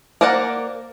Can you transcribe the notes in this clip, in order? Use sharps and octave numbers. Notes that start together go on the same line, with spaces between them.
A#3 A#4 C5 D5 F#5